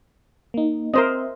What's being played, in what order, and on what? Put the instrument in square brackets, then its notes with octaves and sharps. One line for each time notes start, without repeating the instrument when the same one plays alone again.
[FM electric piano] A#3 D#4
[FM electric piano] C4 E5 [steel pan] A#4 C5 D#5